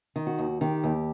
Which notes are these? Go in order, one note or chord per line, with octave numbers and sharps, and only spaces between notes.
D#3
F#4
D#2
D#3 G4
D#2